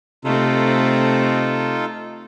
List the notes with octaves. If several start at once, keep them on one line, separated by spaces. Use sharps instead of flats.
C3 A3 C4 D#4 F4 A4